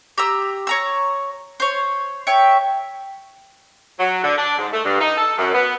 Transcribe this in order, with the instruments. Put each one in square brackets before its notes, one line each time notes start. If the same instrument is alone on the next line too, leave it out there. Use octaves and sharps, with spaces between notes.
[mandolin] G4 A#5 E6
C#5 A#5 E6
C5 C#5
C#5 E5 G5
[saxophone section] F#3
D3
D4
G#2
A3
G2
D#4
A4
F#2
B3